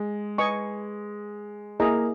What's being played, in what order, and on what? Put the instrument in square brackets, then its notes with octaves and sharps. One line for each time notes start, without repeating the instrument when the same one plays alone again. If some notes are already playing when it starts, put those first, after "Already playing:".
Already playing: [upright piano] G#3
[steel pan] B4 D#5 G#5 C#6
[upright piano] A#3 [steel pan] E4 G#4 D#5 A#5